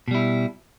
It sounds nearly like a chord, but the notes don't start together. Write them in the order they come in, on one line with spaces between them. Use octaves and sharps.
B2 G3 E4